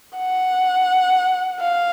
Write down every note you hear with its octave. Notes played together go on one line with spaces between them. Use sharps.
F#5
F5